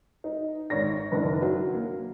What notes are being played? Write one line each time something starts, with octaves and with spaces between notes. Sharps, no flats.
D#4
G#1 C#5 D5 A#6
F#1 D#3 D4 B4
F#3
A#3